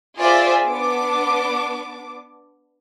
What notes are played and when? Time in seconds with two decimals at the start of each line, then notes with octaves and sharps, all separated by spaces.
0.17 F4 G#4 C5 D5 E5
0.65 B3 D4 D6